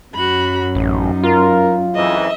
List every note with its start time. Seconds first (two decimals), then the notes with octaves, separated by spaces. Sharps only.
0.15 F#2 F#4 B5
0.75 A1 D#4
1.23 F4 A#4
1.95 F2 G#2 E3 D#5 E5